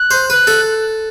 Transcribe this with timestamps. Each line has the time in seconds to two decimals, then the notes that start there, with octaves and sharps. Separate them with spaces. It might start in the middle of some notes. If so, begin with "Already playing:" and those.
Already playing: F#6
0.11 C5
0.30 B4 F#6
0.47 A4